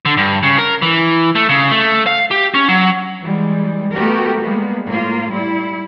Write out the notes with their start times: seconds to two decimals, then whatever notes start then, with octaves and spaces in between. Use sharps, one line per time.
0.05 D3
0.17 G2
0.43 C#3
0.59 A#4
0.82 E3
1.35 A3
1.49 C#3
1.71 A3
2.07 F5
2.31 G4
2.54 C#4
2.69 F#3
3.20 E3 G3 G#3
3.92 A3 B3 F#4 G4 A#4
4.41 G3 G#3 A#3 B3
4.86 A2 A#3 F4
5.31 G3 E4